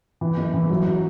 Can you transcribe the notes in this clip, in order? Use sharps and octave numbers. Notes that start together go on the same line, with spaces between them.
E3
F#1
E3
F#3
F#3